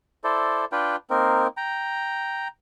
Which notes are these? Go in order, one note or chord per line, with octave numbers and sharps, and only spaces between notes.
E4 A4 C5 D5
D4 F4 B4 G5
A#3 C4 D#4 A#4
G5 A#5